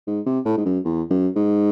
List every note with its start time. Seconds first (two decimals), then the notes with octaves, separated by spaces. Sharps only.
0.07 G#2
0.26 C3
0.45 A2
0.57 G#2
0.65 F#2
0.84 E2
1.10 F#2
1.36 G#2